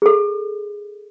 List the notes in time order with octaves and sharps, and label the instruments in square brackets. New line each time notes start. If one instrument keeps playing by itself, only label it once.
[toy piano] G#4 A4